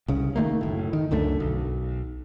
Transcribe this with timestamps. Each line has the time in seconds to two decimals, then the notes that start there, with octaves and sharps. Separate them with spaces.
0.08 C2 C#3
0.36 D#3 A3 A#3
0.61 F#1 A2
0.93 D#3
1.11 C#2 F#2 D3 A3
1.40 B1